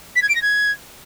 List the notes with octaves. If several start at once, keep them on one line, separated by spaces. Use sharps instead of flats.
B6
G#6
D7
A#6
G#6